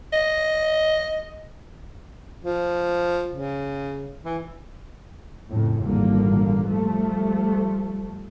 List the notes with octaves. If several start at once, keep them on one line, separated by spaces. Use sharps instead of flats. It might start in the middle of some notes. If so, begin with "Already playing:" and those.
D#5
F3
C#3
E3
F2 A2 C#3
G#1 E2 A#2 D3 G3 A#3
F3 G3 A3